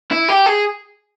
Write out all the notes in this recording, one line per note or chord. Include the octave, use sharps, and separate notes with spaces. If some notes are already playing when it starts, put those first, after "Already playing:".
E4
G4
G#4